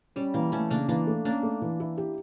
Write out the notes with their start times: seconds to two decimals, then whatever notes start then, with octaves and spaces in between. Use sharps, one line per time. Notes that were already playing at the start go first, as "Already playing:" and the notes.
0.16 G3 C#4
0.34 E3 A#3
0.52 E3 A3 C#4
0.70 C#3 A#3 D4
0.89 E3 A#3 D4
1.07 A3
1.25 A#3 C#4 D4
1.43 A3
1.62 E3
1.80 E4
1.98 G4